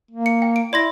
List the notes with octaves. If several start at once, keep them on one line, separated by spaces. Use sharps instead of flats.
A#3
C#7
G5
D7
E4 D5 C6 A#6